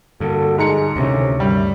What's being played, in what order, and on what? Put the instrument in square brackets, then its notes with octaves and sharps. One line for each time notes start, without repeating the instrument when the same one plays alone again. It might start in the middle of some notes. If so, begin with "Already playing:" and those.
[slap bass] G2 D3 [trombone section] A#3 F#4 A4
[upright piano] G#2 A#5 C#7 [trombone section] G#3 G#4
[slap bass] D2 [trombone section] A2 D#3 A3 [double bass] C3 C#4
[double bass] G2 [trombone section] D#3 A3 [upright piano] G3